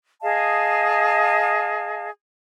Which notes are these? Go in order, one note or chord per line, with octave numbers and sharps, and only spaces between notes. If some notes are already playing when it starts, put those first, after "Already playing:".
G#4 D#5 F5 A5